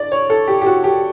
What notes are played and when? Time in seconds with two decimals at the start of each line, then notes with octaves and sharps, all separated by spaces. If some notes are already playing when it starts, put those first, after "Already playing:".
Already playing: D3 D5
0.12 C#5
0.30 A4
0.48 G4
0.61 G4
0.66 F#4
0.84 G4